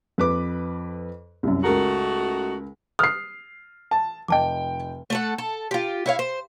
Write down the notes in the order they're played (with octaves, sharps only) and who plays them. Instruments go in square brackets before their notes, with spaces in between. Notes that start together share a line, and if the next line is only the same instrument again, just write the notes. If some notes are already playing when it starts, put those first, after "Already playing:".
[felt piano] F2 B4 D6
C2 F#2
[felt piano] C#2 A#4 A#5 [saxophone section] A3 D#4 F#4
[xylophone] D#6 F#6 [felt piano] F6 C7
[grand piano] A5
[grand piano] F1 G5 [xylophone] D#5 A5 D6
[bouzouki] A3 A4 F#5
A4
F4 G4
E4 C#5 F5
C5